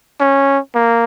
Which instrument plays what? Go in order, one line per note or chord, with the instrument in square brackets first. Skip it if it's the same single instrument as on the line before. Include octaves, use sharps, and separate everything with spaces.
[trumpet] C#4
A#3